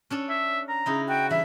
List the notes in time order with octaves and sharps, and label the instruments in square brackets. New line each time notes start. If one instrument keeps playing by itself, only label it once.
[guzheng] C#4 D4 A4
[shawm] E5
A#5
[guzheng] C#3 D#4 E4
[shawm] F#4 [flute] G5
[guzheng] E3 G3 D4 [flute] E5